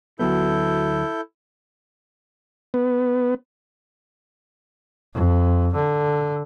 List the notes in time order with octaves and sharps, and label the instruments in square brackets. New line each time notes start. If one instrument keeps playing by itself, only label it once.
[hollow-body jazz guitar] D2 F#3 B3 [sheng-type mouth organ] E4 A4 G6
[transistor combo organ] B3
[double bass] F2
D3